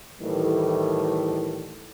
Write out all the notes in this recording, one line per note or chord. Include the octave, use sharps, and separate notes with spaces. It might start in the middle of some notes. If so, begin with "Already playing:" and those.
A2 D#3 E3 G3